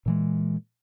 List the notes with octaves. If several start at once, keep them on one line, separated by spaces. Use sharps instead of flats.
A#2 E3 G#3